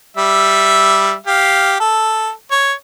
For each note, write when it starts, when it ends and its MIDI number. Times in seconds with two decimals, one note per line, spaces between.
0.17 1.15 55
0.17 1.15 76
1.26 1.75 67
1.26 1.75 77
1.80 2.30 69
2.51 2.73 73